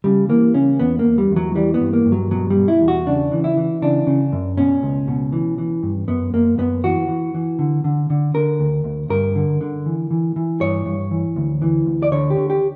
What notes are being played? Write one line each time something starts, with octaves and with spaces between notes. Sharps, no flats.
C#3 G3
E3 A#3
C#3 C#4
E2 B3
A#3
E2
G3
E2
F#3
E3 G3
B3
G2
A#3
G2
F#3
B2 F#3
G3
B2
E4
E2
F#4
C#3 D4
E3
E4
E3
C#3 D4
C#3
F#2
B2 C#4
C#2
B2
E3
E3
G2
F#2 B3
F#2 A#3
F#2 B3
E3 F#4
E3
E3
D3
D3
D3
D3 A#4
D2
D2
G2 A#4
D3
D3
E3
E3
E3
G2 C#5
G2
E3
D2
E3
D2
D5
D3 C#5
G4
D3
G4